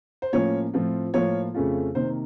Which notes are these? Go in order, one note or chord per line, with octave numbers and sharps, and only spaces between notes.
C5
A2 F3 A#3 C#4 F4 C#5
A2 F3 C4 F4
A2 F3 A#3 F4 C#5
F2 C#3 A3 C#4 F4
C3 D#3 A#3 C5